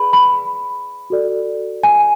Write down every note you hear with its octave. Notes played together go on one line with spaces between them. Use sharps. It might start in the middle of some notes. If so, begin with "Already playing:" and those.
Already playing: G#4 B4 D5 B5
B5
F#4 A4 D5
G#5